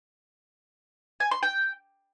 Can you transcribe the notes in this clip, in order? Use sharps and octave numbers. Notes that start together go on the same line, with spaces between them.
G#5
C6
G5